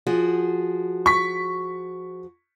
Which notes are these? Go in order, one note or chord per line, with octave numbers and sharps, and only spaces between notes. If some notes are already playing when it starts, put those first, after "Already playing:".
F3 F#4 G#4
C#6 B6